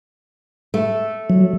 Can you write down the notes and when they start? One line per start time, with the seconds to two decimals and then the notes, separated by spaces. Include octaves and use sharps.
0.74 A3
1.30 F#3